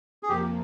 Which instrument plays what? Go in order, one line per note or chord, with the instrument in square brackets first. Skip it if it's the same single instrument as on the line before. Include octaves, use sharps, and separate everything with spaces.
[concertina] G#4
[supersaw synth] F2 C3 F3 A#3 [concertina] G4